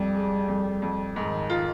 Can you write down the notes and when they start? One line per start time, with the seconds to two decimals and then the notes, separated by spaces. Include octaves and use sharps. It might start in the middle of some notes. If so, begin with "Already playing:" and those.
Already playing: F2 G3
0.15 G#3
0.48 F2
0.82 F2
1.15 G#2 D#3
1.50 F4